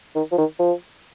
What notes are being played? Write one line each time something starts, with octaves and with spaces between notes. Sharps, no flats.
D#3
F3
D#3
F3